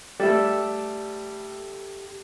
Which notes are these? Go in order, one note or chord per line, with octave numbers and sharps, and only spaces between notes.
G3 A3 G4 A4 E5